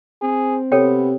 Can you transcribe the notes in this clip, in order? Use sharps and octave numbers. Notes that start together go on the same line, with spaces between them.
C4 G#4
C3 B3 A4 C#5 G5